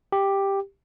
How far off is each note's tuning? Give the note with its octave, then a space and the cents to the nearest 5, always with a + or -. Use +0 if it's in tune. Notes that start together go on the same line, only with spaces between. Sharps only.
G4 +5